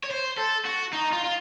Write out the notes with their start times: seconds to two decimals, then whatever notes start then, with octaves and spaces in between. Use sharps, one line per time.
0.03 C#5
0.11 C5
0.38 A4
0.65 F#4
0.93 D#4
1.12 F4
1.24 F4